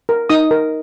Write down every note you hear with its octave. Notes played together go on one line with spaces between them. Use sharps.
A#4
D#4 D#6
A#4